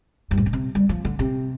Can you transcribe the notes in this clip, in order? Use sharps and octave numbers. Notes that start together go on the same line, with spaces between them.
G2
A2
A#2
C3
G3
F3
D3
C3